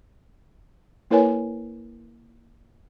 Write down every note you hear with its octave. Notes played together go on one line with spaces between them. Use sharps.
A#3 E4 A#4 B4 C#5 G#5